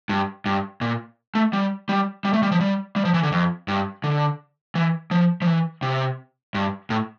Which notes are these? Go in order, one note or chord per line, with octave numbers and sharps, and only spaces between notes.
G2
G2
A#2
A3
G3
G3
G3
A3
G3
F3
G3
G3
F3
E3
D3
F2
G2
D3
E3
F3
F3
E3
C3
G2
A2